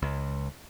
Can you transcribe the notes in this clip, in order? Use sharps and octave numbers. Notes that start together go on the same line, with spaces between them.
C#2